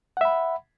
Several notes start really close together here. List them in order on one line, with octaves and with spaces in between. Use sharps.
F#5 E5 B5